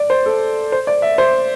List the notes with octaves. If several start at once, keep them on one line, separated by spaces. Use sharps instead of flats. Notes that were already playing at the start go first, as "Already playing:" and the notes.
Already playing: D5
C5
A4
C5
D5
E5
C5